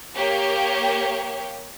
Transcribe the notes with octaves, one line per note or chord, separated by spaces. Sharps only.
A#3 G4 C#5